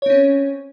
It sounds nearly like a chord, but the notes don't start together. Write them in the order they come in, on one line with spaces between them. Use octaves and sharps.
C#5 C4 C#4